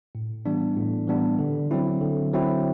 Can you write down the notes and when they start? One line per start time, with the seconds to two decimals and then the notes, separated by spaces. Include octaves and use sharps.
0.15 A2
0.45 E3 G3 B3 D4
0.77 A2
1.08 E3 G3 B3 D4
1.39 D3
1.71 F#3 C4 E4
2.01 D3
2.33 F#3 C4 E4